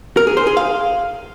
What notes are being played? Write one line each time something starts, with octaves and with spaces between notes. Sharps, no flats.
A#4
G#4
C5
G#4
F5